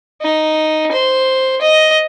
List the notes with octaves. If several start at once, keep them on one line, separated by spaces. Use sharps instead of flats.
D#4
C5
D#5